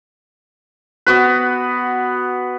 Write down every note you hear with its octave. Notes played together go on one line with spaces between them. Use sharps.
B3 F#4 B4